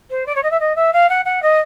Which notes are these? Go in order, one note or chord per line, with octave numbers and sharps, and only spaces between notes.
C5
D5
C#5
D#5
E5
D#5
E5
F5
F#5
F#5
D#5